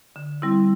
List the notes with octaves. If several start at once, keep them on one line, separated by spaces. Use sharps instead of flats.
D3
G3 C4 E4